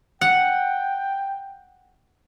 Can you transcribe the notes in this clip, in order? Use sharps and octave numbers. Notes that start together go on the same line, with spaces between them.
F#5 G5